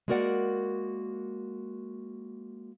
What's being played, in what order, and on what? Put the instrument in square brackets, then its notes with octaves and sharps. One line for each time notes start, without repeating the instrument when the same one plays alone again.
[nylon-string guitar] G#3 A#3 F#4 A#4 D5 F#5